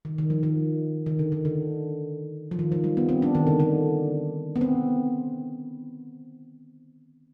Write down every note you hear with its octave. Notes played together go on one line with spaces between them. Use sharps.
D#3
D#3
F3
D#3
D#3
D3
D#3
D3
F3
D#3
F3
G3
B3
C4
D4
D#3
D3
D3
B3
C4